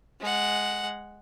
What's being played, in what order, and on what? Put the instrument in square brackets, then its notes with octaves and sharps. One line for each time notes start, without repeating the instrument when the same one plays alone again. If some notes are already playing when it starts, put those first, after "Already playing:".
[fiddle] G#3 F#5